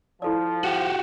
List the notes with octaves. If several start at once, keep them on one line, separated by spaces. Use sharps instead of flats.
F3 E4 A4 D5
F#4 G4